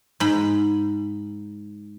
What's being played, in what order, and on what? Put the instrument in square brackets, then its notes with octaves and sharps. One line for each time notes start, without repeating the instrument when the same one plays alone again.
[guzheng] G#2 B5